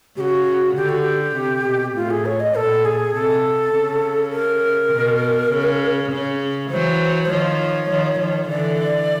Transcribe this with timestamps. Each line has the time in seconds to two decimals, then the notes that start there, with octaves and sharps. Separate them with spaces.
0.17 C#3 F#4 G4
0.76 D3 G4
0.89 F#4
1.01 G4
1.36 C3
1.66 B2
1.96 A2 F4
2.10 G#4
2.25 C#5
2.40 D#5
2.55 A#2 A4
2.85 G#4
3.14 C3 A4
3.74 C#3
4.33 A#4
4.93 B2
5.52 C#3
6.11 C#3
6.71 E3 F#3 C5
7.23 C5
7.30 D#3 F3 C#5
7.90 D#3 F3
8.19 D#3 F3
8.49 D3 E3 D5